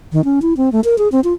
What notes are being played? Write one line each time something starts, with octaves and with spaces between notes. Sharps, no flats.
D#3
C#4
E4
C4
A3
A#4
G#4
C4
F4